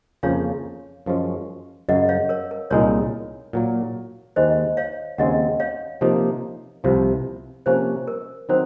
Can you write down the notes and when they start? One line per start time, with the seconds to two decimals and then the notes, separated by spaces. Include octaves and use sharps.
0.23 F2 C#3 F3 A#3 C#4 C#5 F5
1.06 F#2 F3 G#3 C#4
1.89 F#2 C#3 F#3 D#5 F#5
2.09 C#5 F5
2.29 A#4 C#5
2.51 A#4
2.70 C2 A#2 G#3 D#4 A#4 C#5
3.53 A#2 F#3 A#3
4.36 D#2 D#3 G#3 C5 D#5
4.77 C#5 F5
5.18 D#2 C#3 G#3 C4 D#5 F#5
5.60 C#5 F5
6.01 C3 F3 A#3 D#4
6.84 C2 C3 F3
7.66 C3 F3 A#3 C#4 C5
8.08 A#4
8.49 D#3 F#3 C4 D#4 C5